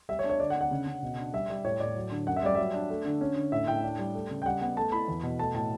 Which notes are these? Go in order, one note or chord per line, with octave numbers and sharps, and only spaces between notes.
G3 E5
C#5
D4
C#5
D3 D5
F#5
D3
F#5
C#3
C#3
B2
D4
G3 E5
G3
A2 C#5
A2 D5
F#3
D3
F#2 F#5
E5
G3 D5
F#3 E5
D4
A3
D3
C#4
D3
A2 E5
A2 G5
D4
G3
A3
C#3
G5
G3 F#5
B3 F#5
A3 A5
E4 B5
E2
B2
A3 A5
A2 A5